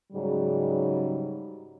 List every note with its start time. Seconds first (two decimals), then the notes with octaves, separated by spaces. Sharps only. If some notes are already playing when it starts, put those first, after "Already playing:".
0.12 G#2 C#3 F#3 G3